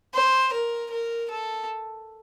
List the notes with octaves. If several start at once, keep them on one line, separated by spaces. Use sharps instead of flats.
C5
A#4
A#4
A4